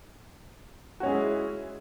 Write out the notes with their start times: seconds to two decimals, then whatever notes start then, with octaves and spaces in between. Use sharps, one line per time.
1.00 F#4
1.03 C#4
1.06 G#3
1.09 G#4
1.11 E4